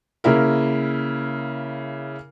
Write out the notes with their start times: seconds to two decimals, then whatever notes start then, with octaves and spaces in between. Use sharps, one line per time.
0.24 C#3 A#3 E4 A#4